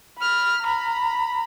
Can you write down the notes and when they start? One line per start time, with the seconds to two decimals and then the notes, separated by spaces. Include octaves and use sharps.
0.18 B5 F6
0.62 A#5 B5